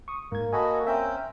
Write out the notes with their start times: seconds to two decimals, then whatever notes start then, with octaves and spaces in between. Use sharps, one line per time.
0.08 C#6 D#6
0.32 G#2 A#3 G#6
0.53 F#4 A4 D#5 G#5 B5
0.87 C4 C#4 E5 G5 G#5 A#5